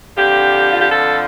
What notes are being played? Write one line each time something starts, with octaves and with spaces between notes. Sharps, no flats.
F2 D3 F3 G4
F4
G4
A4